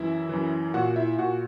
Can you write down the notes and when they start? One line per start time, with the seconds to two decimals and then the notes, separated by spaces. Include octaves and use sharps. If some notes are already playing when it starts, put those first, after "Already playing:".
Already playing: F#2 E3 E4 E5
0.29 F#2 E3
0.74 A#2 F#4 F#5
0.96 E4 E5
1.18 A#2 F#4 F#5